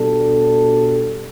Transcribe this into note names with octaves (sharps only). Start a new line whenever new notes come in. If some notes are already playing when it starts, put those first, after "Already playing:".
Already playing: B2 G3 D4 A4